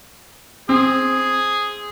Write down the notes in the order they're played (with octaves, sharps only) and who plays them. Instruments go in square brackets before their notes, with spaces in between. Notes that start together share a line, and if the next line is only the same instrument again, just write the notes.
[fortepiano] C4 [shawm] G#4